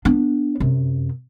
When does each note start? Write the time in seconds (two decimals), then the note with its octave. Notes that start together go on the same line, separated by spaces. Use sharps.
0.05 B3 D4
0.60 F#2 C3